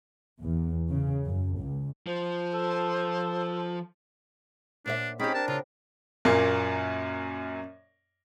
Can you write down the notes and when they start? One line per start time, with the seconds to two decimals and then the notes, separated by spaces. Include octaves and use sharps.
0.42 E2
0.91 C#3
1.27 F#2
1.60 C#2
2.06 F3 C5
2.54 A4
4.86 A#2 D4 C#5 E5
5.20 C4 C#4 D#4 G4 G#4 B5
5.34 D4 A#4 A5
5.48 C#3 F4
6.25 F#2 A#2 A#3